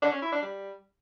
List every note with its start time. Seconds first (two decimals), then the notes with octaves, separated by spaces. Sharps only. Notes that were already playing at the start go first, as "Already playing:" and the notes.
0.02 D4
0.12 C#4
0.22 E4
0.32 D4
0.42 G3